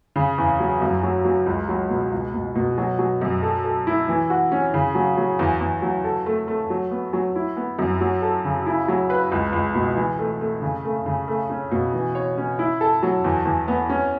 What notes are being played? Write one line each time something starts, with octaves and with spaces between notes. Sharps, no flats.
C#3
E2
F#3
F#2
F#3
F#3
C#2
F#3
B2
C#2
B2
B2
F#3
F#3
F#2
A4
A4
E4
E3
F#4
C#4
C#3
F#3
F#3
E2
E2
F#3
A4
A3
A3
F#3
B3
F#3
E4
B3
F#2
F#3
A4
C#3
E4
F#3
B4
C#2
C#2
B2
E3
A3
A3
C#3
A3
C#3
A3
C#4
B2
E3
C#5
C#4
E4
A4
F#3
E2
E2
B3
C#4